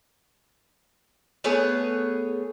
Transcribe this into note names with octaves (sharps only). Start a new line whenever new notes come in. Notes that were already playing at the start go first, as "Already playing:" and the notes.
A3 B3 G#4 C#5